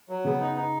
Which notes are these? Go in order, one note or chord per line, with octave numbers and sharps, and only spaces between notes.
F#3
C#3 B3
D#4
D#4